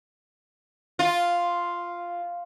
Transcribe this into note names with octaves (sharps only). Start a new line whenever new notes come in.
F4